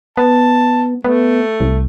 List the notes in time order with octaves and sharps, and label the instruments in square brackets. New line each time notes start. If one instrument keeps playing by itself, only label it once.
[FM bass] B3 [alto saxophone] A5
[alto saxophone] A3 [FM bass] B3
[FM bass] C2